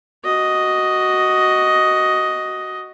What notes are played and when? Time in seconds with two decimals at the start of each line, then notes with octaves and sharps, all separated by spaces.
0.24 F#4 D#5